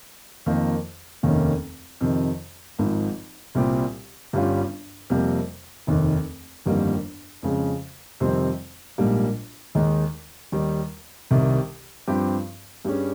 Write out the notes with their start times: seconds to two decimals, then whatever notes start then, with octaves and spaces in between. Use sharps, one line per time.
0.46 F2 D#3 A#3
1.23 F1 D#2 D#3 A#3 C#4
2.01 F2 C3 D#3
2.79 G#1 G#2 F3
3.55 C2 A#2 G3 C4 G4
4.33 G1 G2 G3 C#4 F4
5.10 F2 C3 G3 A#3
5.87 F1 D#2 D#3
6.66 G1 F2 D#3 G3 A#3
7.43 F2 C#3 G#3
8.20 F2 C3 D#3 G3 C4
8.98 A#1 G#2 G3 A#3
9.75 D#2 D#3 G#3 D#4
10.52 D#2 D#3 G3
11.31 C2 C3 D#3
12.08 G2 F3 C4 G4
12.85 G2 G3 C#4 G#4